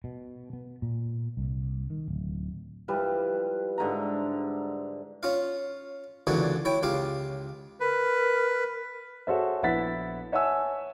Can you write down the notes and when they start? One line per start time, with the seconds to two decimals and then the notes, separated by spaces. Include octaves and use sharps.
0.04 B2
0.53 B3
0.82 A#2
1.37 C2
1.90 D#3
2.08 D1
2.88 F3 G3 E4 B4
3.78 G#2 D3 E5 A#5
5.23 C#4 F4 F5
6.27 C#2 A#2 D3 E3 F#4 G#5
6.65 E4 C#5 G5
6.83 C#2 F4 G4 F5
7.80 A#4 B4
9.27 F#4 G#4 A4 C5 C#5 E5
9.63 A#1 B3 E4 F#5 A6 B6
10.32 C#5 E5 F#5 G#5 A5 E6